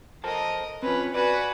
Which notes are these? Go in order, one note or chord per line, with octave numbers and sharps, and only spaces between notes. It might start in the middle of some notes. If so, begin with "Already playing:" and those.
A4 A#4 C5 D#5 A5
C4 C#4 F4 B4
F#4 B4 D5 G#5